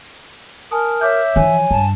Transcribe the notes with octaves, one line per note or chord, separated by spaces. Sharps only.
A#4 G#5 A5 D#6
C#5 E5 D6 G6
E3 F3 C#5 G#5
G2 A5